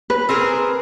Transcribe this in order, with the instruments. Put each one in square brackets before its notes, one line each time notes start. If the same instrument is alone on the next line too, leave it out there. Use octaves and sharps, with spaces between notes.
[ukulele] B4
[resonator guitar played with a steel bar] C4 G#4 A#4